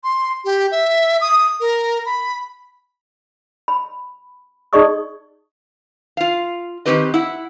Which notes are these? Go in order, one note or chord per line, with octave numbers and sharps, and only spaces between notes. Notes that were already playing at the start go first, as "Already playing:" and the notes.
C6
G4
E5
D#6
A#4
B5
B5
D#4 G#4 D5 D#5 C#6 D#6
F4 F5
D#3 G3 C4 G4 B4 D#5
E4 F#5